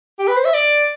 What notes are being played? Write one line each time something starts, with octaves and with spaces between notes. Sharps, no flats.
G4
B4
C5
E5
D5